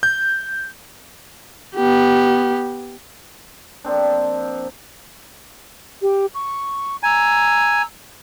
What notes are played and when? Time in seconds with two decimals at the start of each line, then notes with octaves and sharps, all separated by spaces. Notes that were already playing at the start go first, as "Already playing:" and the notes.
0.03 G6
1.75 B3 G4
3.84 F3 A#3 C4 D4
6.02 G4
6.32 C#6
7.03 G#5 A#5 E6